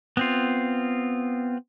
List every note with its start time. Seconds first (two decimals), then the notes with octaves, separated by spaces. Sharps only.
0.17 B3 C4 F4